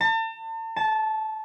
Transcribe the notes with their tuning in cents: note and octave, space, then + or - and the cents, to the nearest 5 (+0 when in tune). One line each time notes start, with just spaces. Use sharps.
A5 +40
A5 -15